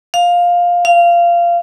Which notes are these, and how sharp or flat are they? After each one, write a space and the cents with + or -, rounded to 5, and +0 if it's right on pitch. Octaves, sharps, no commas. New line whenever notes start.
F5 +10
F5 -20